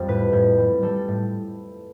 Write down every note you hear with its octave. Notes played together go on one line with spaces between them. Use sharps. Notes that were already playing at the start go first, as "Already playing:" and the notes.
Already playing: F2 G3
A2 B4
A2
G3
G3 A4
A2